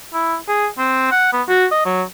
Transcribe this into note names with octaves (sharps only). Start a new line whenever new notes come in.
E4
G#4
C4
F#5
B3
F#4
D#5
F#3